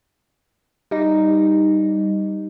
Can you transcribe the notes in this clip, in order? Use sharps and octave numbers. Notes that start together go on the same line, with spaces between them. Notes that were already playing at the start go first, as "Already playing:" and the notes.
G3 D#4